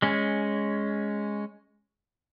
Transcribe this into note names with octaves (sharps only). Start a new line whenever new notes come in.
G#3 C#4